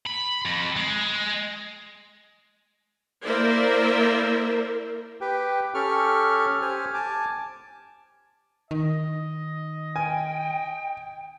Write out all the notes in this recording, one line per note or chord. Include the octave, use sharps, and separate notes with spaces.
B5
F2
G#3
A#3 E4 A#4 C5 D5 E5
G4 B4 G5
C#4 G4 A4 C#6 F6
G4 C5 G#5 F6
G#5 A5 D6
D#3 D#5
G5 G#5